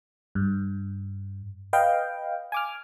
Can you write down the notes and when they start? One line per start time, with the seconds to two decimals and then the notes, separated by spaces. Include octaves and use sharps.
0.35 G2
1.73 B4 D#5 F5 G5
2.52 G#5 D6 F6